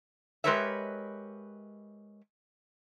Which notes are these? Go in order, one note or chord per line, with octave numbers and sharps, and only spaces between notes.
G#3 G4 A#4 B4 C#5 E5